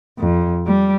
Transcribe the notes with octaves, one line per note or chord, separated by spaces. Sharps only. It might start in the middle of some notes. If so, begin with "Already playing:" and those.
F2
G3